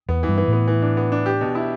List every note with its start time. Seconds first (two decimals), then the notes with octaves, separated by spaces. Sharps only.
0.09 E2 B3
0.23 E3
0.28 G2
0.37 E3
0.48 A2 B3
0.67 E3
0.82 D4
0.97 B3
1.12 D4
1.26 G4
1.41 B2
1.55 E4